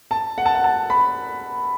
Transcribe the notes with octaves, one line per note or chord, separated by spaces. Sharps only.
A5
F#5
A5
F#5
A5
B5